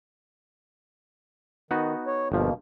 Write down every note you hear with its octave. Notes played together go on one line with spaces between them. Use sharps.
D#3 B3 D#4 F#4
C#5
G1 B2 F3 A#3